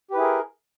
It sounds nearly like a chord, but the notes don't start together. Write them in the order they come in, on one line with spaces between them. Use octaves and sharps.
G4 B4 E4 G#4 A#4